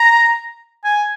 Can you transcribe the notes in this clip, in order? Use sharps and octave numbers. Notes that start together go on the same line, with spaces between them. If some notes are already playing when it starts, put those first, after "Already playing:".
Already playing: A#5
G#5